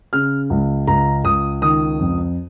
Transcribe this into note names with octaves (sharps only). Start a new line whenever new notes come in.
C#3 F6
C#2
C#2 A#5
C#2 D#6
D#3 D#6
F2